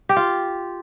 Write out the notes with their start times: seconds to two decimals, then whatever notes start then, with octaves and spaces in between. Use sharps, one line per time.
0.09 G4
0.17 F4